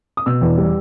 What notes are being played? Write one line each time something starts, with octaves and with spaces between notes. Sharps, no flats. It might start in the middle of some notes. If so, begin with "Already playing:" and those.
D#6
B2 E6
E2
G3